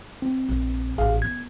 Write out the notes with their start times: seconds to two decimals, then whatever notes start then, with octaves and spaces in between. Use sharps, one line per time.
0.22 C4
0.48 A#1
0.98 A1 G#4 F5
1.22 B3 G#6